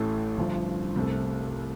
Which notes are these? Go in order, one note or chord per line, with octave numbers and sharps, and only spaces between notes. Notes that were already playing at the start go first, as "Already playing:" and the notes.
Already playing: A1 A2 A3
G1 G2 F3
C2 C3 A3